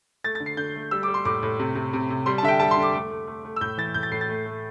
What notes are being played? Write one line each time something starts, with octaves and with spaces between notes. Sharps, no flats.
A3 A6
A6
D3
C7
D3 G6
A3
G3 E6
D6
G3
C6
A2 D6
A2
C3
C3
C3
C3
G3 C6
A5
D3 E5
G5
G3 A5
C6
D3
D6
A3
A3
A3
A3
E6
A2 G6
E3 A6
A2 G6
A6
A2 C7
A6
A3
A3